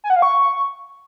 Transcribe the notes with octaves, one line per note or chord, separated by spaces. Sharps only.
G#5
F#5
F5
C#6